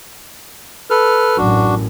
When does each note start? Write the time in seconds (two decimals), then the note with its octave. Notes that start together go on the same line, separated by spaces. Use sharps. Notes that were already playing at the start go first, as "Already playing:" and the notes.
0.90 A4 B4 F6
1.38 A1 F#2 A2 D4 F#4